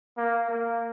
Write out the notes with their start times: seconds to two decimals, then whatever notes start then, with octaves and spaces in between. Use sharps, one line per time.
0.18 A#3
0.50 A#3